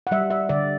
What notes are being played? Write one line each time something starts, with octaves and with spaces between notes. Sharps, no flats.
F#5
G3 E5
E5
D3 D5